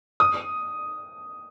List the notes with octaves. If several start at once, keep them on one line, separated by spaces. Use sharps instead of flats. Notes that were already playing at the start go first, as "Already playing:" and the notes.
D#6